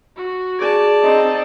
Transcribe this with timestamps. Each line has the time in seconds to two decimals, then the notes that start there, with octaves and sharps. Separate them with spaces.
0.17 F#4
0.59 G#4 D5 A5
1.03 C4 D#4 D#5